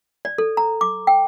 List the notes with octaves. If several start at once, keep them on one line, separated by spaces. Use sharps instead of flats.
D5
A4
A#5
D6
G5